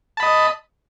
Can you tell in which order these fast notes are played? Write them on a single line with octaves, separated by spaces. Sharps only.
A5 B5 D#5